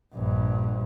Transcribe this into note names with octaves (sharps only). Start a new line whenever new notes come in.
A#1 G2